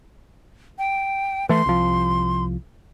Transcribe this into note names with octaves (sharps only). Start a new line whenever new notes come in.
G5
E3 A3 C6
C2 F3